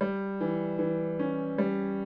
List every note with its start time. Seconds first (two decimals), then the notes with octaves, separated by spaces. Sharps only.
0.01 G3
0.41 E3
0.79 E3
1.19 C#4
1.58 G3